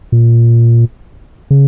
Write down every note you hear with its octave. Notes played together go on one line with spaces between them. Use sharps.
A#2
C#3